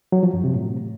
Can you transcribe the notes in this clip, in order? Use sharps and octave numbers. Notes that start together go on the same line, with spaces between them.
F#3
F3
F#2
C3
A2